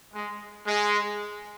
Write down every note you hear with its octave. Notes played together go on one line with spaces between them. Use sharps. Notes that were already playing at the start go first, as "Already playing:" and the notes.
G#3
G#3